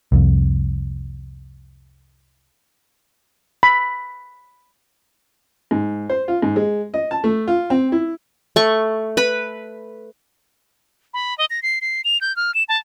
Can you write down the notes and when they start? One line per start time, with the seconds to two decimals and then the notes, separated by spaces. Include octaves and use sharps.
0.12 C2 F2
3.63 B5
5.71 G#2
6.10 C5
6.28 F4
6.42 G#2
6.56 G#3
6.94 D#5
7.11 A5
7.24 A3
7.47 F4
7.70 C4
7.92 E4
8.56 A3 C#6
9.17 B4 B5
11.14 B5
11.38 D#5
11.50 A#6
11.63 C7
11.81 C7
12.04 F7
12.21 G6
12.36 F6
12.54 E7
12.69 A5